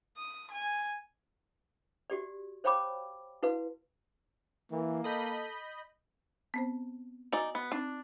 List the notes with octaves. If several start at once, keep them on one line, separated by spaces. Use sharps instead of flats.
D#6
G#5
F#4 G4 D5
C5 C#5 F5 G5 B5 D6
E4 F#4 B4 F5
E3 A#3
A4 D#5 B5 G6
B3 C4 C5
D#4 F#4 D5 D#5 G#5
B3
C4 D4 D#4